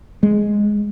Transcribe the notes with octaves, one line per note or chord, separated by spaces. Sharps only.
G#3